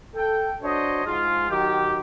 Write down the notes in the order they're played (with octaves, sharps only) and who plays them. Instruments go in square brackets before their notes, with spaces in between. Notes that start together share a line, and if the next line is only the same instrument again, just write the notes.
[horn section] A4 G5
D4 F#4 C5 C#5 D#5
G#2 F4
D#3 F#3 G4